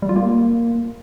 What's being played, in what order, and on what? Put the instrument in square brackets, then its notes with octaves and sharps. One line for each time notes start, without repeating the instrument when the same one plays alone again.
[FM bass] G3
F4
A#3